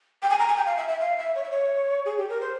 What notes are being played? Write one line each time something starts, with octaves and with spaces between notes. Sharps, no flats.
G5
G#5
A#5
G#5
G5
F5
E5
E5
F5
E5
C#5
E5
C#5
G#4
G4
A#4
C5